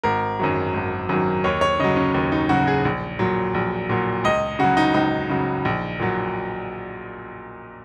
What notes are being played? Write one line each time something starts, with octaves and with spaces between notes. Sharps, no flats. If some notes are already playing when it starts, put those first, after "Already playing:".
G#1 A#4
F#2 D#3 F#3
G#1
F#2 D#3 F#3
D#2 C#5
C#5
C#3 F#3 D#5
C#4
D#2
D#4
C#3 F#3 F#4
G#4
A#1
A#2 F#3
A#1
A#2 F#3
C#2 D#5
C#3 F#3 F#4
D#4
C#2 D#4
C#3 F#3
A#1
A#2 F#3